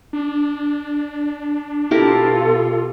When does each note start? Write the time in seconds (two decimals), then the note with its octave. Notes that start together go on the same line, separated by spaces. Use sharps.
0.13 D4
1.91 B2 E4 F4 G4 A4 A#4